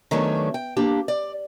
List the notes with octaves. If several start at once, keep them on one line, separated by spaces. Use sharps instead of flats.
D#3 F#3 A3 B3 C#4 D4
G5
A#3 D4 G4
D5